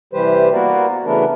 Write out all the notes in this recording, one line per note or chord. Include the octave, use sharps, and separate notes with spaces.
C3 E3 G3 G4 B4 C5
A#3 B3 F#4 A#4 D5
C#3 E3 A3 B3 D4 A#4